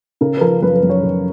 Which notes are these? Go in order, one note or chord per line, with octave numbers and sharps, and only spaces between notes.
C#3 A#4
B4
F3 A#4
F#2 B4
B4
F#2
C#5
C#3